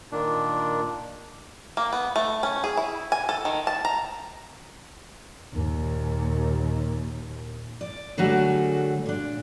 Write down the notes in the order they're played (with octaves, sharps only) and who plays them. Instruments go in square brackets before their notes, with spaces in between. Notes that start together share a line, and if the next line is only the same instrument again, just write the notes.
[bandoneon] A#2 D#3 D4
[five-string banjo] A#3
B3
A3
C#4
G#4
E4
G#5
A4
D#3
A5
A#5
[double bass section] D#2 A#2
[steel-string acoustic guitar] D5
D3 F#3 G3 A3 F#4 G#4
A#2 D4